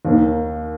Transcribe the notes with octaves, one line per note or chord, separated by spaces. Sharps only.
D#2 D#3 A#3